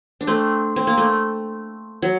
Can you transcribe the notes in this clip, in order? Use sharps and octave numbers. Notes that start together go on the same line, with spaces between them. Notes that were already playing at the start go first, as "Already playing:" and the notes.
D4
A3 C4
C4
A#3
A3
F#3